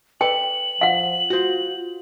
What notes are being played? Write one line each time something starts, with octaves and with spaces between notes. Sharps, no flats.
A4 B4 D5 G5 F#7
F3 F5 F#5
F4 F#4 C5